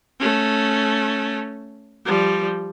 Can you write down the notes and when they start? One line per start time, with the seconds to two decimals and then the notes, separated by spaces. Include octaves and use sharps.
0.20 A3 C#4
2.06 F3 G3